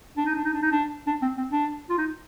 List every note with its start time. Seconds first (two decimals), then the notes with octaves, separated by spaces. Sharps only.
0.17 D4
0.26 D#4
0.35 D4
0.44 D#4
0.54 D4
0.62 D#4
0.72 D4
1.07 D4
1.22 C4
1.37 C4
1.52 D4
1.90 F4
1.98 D#4